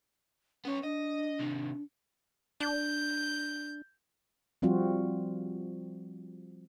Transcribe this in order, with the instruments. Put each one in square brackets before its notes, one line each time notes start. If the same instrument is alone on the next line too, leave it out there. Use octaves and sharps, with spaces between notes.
[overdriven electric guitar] B3 C#5 [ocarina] C#4
[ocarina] D4 [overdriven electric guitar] D#5
[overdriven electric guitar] C3 D#3
[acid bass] D4 [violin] G6
[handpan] F3 G3 C4 F4 F#4